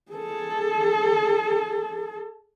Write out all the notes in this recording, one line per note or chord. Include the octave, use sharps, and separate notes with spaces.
G#4 A4